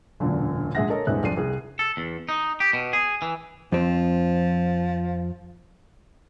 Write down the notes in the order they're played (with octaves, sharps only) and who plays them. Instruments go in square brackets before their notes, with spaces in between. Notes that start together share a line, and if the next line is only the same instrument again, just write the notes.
[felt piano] E1 F#2 A#2 D3
A#1 G#3 G#4 E5 F#5 A#6
A4 A#4 C#5 D#5
D#1 G#2 G#3 B3 E5 F#6
F2 D4 A4 C7 D#7
C2 G#4
[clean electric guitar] A4
E2
D#4
G4
B2
G#4
E3
[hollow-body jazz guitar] F2 C4 [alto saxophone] F3